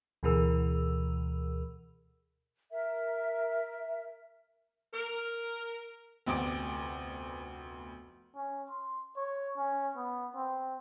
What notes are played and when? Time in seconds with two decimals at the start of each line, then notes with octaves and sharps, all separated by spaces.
0.23 D2 B2 E3 G#4 A#4 E6
2.71 A#4 E5
4.94 A#4
6.27 F1 D2 B3 D6 D7
8.36 C#4
8.70 C6
9.17 C#5
9.57 C#4
9.97 B3
10.36 C4